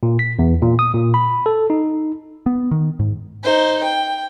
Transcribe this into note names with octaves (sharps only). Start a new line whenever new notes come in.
A#2
B6
E2
A#2
D#6
A#2
B5
A4
D#4
B3
D#3
G#2
D#4 C5
G5